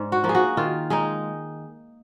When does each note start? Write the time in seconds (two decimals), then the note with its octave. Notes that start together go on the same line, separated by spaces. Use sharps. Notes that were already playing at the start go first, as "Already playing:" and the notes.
Already playing: G#2 D4
0.12 F#4
0.24 F3 A#3
0.29 G#4
0.35 F#4
0.57 D#3 F4
0.90 G#3 D#4 G#4